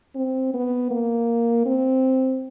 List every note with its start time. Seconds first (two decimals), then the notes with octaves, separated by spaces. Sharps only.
0.15 C4
0.54 B3
0.91 A#3
1.66 C4